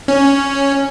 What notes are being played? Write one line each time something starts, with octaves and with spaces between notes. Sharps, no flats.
C#4